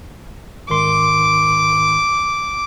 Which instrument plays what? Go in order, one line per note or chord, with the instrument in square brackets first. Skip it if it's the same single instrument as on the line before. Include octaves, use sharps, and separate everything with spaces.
[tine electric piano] G#2 D#3 C6 [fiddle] D6